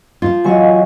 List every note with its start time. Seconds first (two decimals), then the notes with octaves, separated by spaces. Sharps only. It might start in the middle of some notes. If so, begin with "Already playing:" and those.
0.22 F3 F4
0.44 E3 F#3 D#5 F5 G#5 C#6